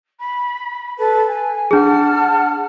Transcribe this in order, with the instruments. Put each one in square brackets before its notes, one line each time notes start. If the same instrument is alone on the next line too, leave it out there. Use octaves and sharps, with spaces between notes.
[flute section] B5
A4 B4 A5
G#5
[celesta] D4 G#4 [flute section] F#5 A5 F6